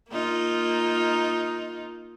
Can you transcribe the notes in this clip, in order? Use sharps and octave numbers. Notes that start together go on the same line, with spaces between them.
A#3 D#4 F4